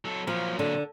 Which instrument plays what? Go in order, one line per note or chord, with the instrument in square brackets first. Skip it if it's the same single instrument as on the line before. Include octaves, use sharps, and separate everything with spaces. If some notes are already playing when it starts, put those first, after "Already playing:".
[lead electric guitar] F#3 A4
[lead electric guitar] A#2 F#3 [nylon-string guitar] F3
[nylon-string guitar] D3